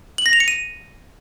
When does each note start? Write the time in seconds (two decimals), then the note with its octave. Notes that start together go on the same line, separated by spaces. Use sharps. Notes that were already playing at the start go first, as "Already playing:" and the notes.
0.18 F#7
0.26 A#6
0.33 F7
0.40 C#7
0.48 D#7